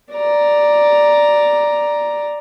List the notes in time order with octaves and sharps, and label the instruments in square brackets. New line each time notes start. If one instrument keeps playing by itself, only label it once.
[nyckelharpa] D5 A#5